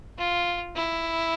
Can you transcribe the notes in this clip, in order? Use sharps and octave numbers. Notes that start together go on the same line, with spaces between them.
F4
E4